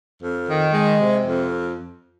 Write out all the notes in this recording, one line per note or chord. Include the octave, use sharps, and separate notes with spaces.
F2
D#3
G#3
C3
F2